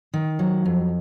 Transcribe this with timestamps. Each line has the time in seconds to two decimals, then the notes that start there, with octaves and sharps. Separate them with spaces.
0.14 D#3
0.39 F#3
0.65 F2